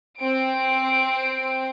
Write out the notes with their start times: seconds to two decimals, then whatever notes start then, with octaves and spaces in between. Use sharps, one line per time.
0.19 C4 D7